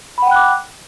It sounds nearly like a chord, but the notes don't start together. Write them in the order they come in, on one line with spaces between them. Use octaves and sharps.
B5 F#5 G5 F#6 D6